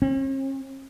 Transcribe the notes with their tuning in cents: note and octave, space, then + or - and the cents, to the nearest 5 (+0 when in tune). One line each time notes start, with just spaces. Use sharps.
C#4 -45